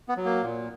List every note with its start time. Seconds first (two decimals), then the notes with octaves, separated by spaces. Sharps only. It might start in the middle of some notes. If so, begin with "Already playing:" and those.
0.09 B3
0.17 F#3
0.25 A#3
0.43 A#2